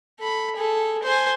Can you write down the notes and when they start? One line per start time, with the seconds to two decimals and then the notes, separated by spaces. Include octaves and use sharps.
0.20 A4 B5
0.56 G#4 A4
1.03 C5 G#5